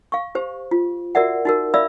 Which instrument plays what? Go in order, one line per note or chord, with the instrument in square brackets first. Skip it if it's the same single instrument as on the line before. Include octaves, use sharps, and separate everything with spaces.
[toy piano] F5 C#6
G4 C5
F4
F#4 A#4 D5 E5 F#5
D#4 F#4 A#4
D5 E5 F5 B5 E6